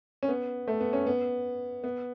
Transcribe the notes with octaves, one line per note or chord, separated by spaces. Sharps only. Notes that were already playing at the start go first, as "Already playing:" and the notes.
C#4
B3
A3
B3
C#4
B3
B3